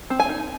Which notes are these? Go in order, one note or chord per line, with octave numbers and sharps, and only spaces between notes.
C4
G#5
D#4